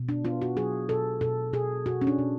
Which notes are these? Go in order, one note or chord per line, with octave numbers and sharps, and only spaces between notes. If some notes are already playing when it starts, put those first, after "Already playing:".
Already playing: B2
D4
B3 F4
F#4
F#3 G#4
B2 A4
B2 A4
B2 G#4
B2 F#4
C#4
D4
B2